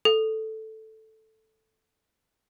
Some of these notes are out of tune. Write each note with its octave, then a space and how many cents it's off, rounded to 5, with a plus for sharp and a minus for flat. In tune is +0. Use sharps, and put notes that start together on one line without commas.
A4 +0